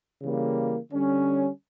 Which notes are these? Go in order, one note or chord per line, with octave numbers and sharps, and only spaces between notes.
C#3 E3 G3 A#3
D3 G3 C#4